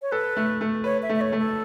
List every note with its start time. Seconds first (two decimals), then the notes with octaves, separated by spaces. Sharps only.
0.02 C#5
0.12 A4 B4
0.37 A3
0.61 A3
0.84 B4 C#5
1.02 E5
1.09 A3
1.15 E5
1.21 C#5
1.32 A3
1.39 A4